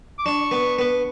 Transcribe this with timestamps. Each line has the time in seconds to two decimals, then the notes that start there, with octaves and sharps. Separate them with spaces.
0.19 D6
0.25 D4 C#6
0.51 B3
0.78 B3